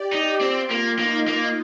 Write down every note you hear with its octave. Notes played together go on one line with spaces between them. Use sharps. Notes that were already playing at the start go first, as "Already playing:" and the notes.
Already playing: G4 D5
D#4
C4 F4
A#3
A#3 D#4
A#3